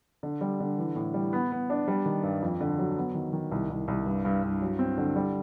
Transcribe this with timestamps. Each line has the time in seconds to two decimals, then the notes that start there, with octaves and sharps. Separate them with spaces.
0.23 D3
0.41 G3
0.60 D3
0.78 E3
0.96 A2
1.14 G3
1.33 B3
1.52 B3
1.70 D4
1.88 G3
2.06 D#3
2.23 G2
2.42 F2
2.61 D3
2.78 F#3
2.97 B3
3.15 D#3
3.33 D#3
3.52 C2
3.70 C2
3.88 C2
4.06 G2
4.25 G2
4.43 G2
4.62 F#3
4.79 C4
4.98 D3
5.16 G3